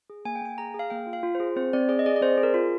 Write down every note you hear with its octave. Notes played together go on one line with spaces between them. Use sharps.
G#4
A#3 G#5
G5
A#3 G#5
G#4 A#5
G#4
F5
A#3 G5
F4
F5
F4
C5
G#4
C4 C5
C4 D5
G#4 D5
D#5
G#4 D5
D5
C4 C5
G#4
A#4
F4